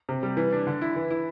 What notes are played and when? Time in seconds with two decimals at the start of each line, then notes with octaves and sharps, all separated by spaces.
0.09 C3
0.23 G3
0.37 E3
0.52 D4
0.67 D3
0.81 E4
0.96 E3
1.11 E4